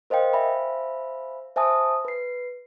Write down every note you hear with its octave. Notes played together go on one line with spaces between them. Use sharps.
A#4 C5 D#5 F5 G5
C5 E5 F5 G#5 B5
C5 E5 G#5 A5 D#6
B4 C7